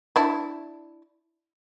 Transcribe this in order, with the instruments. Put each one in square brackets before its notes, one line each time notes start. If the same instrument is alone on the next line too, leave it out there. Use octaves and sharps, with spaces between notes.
[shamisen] D4 E4